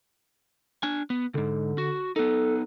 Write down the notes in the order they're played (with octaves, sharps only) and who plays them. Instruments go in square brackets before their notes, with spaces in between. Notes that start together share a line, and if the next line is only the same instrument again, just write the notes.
[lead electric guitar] D4 G#5
B3
[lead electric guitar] C2 G#2 [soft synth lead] D3
[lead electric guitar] F#4
[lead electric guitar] B3 D#4 [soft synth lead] A4